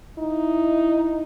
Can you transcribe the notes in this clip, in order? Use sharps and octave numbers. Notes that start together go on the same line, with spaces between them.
D#4 E4